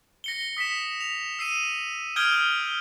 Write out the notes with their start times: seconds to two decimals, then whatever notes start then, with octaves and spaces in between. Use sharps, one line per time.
0.24 A#6 C#7 G7
0.57 D#6 B6 C#7 E7
1.01 F7
1.39 E6 C7 D#7
2.16 D#6 F6 G6 G#6 D7 G7